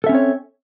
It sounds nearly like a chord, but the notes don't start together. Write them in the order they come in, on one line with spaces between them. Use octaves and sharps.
A4 E5 C#4 C4 C#5